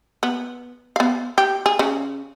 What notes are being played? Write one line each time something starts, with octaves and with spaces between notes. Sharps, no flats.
B3
B3 F5
G4
G#4
C#3